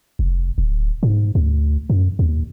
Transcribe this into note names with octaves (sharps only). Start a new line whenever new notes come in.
F1
D1
G#2
D2
F#2
D#2